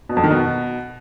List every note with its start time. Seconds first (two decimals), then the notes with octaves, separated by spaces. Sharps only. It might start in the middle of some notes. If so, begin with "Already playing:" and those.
0.09 B2
0.17 F2
0.24 D#3
0.31 B2